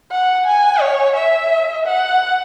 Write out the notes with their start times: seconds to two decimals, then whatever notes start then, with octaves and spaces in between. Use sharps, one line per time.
0.11 F#5
0.46 G#5
0.81 C#5
1.15 E5
1.85 F#5